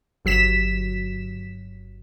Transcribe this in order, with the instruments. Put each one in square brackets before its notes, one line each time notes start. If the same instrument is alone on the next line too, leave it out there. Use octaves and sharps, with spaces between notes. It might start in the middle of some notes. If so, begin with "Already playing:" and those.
[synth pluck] G1 F#3 B6 E7